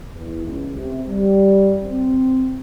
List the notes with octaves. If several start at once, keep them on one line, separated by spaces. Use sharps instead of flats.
E2
C#2
C3
G3
C4